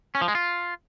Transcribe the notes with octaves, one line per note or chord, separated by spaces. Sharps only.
C#4
F3
G#3
F4